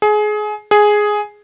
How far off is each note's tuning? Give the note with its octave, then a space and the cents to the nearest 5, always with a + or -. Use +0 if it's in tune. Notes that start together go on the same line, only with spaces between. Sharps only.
G#4 +25
G#4 +5